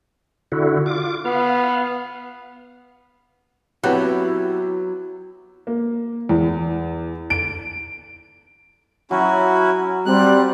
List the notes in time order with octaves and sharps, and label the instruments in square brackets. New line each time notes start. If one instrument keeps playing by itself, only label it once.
[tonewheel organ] D3 E4 F#4
F4 D6
[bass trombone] B3 [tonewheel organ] F5
[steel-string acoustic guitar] F#3 [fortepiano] B3 G4 F#6 [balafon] C4 B4 F#5 [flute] E4
[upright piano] A#3
E2
D7
[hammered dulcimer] F#3 [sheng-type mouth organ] C#4 E4 F#4
[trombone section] G3 [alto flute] C4 [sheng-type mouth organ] F#6